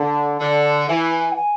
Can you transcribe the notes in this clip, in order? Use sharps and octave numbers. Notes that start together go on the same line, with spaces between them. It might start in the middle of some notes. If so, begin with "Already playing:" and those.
Already playing: D3 A5
D3
E3 G#5
F#5
G#5